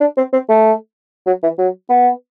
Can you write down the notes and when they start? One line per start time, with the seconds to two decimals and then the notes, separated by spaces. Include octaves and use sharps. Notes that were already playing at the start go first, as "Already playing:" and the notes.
0.01 D4
0.17 C4
0.33 C4
0.49 A3
1.26 F#3
1.43 E3
1.58 F#3
1.90 B3